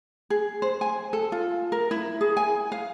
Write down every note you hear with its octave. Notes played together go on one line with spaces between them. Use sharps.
G#4
C5
G#5
A4
F4
A#4
E4
G#4
G#5
F5